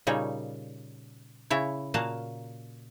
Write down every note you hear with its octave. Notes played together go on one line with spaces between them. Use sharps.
A#2 C#3 G3 D#4 C#5
C#3 E4 C#5
A#2 A#3 F#4 F5 A5